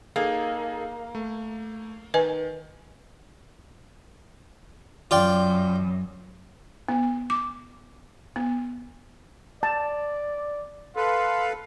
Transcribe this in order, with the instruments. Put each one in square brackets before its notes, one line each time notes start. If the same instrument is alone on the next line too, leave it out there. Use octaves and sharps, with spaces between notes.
[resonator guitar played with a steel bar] A#3 [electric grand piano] D#4 G#4 A4
[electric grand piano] A3
[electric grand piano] D#3 [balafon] B4 D#5 G#5
[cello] F#2 [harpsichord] F4 D5 G5
[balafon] B3
D6
B3
[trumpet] D5 [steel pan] A5
[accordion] A4 B4 [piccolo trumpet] F5 [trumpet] C6